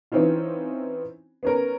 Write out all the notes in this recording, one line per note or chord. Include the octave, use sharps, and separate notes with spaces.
E3 C4 C#4 D#4 F4
B3 C#4 A#4